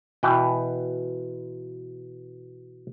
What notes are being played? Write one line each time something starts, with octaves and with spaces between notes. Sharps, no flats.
B2 E3 B4 G5